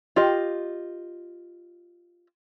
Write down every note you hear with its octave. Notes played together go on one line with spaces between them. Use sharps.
F4 G4 D#5